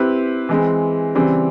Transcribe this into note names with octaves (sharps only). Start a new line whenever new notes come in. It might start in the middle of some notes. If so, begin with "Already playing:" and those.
Already playing: C4 E4 G4 B4
E3 G#3 C4
C#3 E3 G3 C4